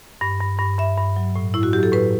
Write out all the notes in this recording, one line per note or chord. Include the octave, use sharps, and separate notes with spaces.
G2
G2
G2
G2 E5
G2
F#3
A2
A2 E4
F#4
F#3 G4
A4
A2 B4